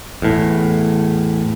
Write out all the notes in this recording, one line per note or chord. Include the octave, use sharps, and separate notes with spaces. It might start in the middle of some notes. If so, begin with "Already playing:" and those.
E2 A2